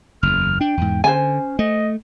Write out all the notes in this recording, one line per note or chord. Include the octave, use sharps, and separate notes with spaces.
F#1 E2 F6
D4 G5
E2 G#2
D3 C#4 C5 G#5
A3 D#5